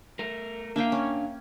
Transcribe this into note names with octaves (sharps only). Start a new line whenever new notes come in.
A3 A#4
A#3 D4 E5 F5 G5
C#4